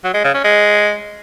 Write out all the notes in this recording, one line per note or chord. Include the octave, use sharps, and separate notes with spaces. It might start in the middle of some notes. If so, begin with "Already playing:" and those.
F#3
G#3
C#3
C#4
G#3